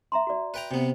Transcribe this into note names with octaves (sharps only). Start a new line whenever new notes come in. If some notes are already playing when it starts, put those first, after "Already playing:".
E5 A#5 C6
F#4 D5
B4 G5 A#5
C3 B3